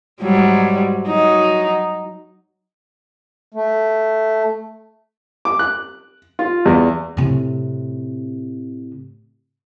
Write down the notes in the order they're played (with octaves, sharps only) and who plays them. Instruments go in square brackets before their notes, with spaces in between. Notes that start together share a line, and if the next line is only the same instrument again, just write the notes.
[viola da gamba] G#2 F#3 G3
F#3 D#4
[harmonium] A3
[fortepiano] D6
F#6
F4
E2
[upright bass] A2 C3